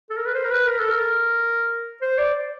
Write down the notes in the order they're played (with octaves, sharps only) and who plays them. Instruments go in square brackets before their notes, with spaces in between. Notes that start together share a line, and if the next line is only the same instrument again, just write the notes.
[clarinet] A4
A#4
B4
C5
A#4
B4
A#4
A4
A#4
C5
D5